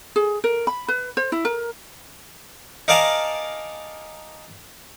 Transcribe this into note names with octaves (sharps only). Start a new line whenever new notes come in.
G#4
A#4
B5
B4
C5
E4
A#4
D#4 A#4 D5 F5 G#5 A5